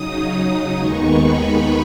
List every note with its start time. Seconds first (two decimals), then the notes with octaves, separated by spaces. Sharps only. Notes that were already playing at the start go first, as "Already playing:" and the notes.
Already playing: C#3 F#3 D#4 D#6
0.34 D#6
0.76 D#2 D#3 G#3 B3 D#4 C#6
1.20 B5